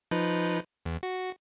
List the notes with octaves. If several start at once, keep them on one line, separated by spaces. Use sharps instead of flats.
F3 D#4 B4
E2
F#4